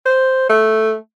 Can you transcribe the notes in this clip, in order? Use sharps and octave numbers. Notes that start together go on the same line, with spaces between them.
C5
A3